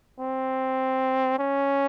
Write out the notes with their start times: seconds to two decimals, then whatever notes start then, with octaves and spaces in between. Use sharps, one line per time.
0.20 C4
1.39 C#4